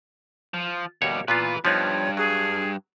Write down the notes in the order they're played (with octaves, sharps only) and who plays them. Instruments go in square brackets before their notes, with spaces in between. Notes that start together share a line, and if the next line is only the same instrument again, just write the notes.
[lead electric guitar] F3
[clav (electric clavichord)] D#2 C#5 [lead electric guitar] B2 G3
[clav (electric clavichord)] A#2 B3 F4 [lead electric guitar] E3 B4
[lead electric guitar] G2 [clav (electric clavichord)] F3 B3 D#4 [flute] C#5
[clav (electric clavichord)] F#3 [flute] G#4